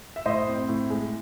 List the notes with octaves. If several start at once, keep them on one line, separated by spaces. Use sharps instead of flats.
E5
A2 C5 D#5
C4
A2
G#3